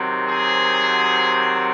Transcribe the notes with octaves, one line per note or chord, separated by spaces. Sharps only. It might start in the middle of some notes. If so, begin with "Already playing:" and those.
Already playing: C3 D#3 F#3
G#4 C5